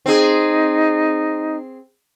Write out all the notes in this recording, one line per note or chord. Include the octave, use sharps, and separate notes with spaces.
C4 D#4 G#4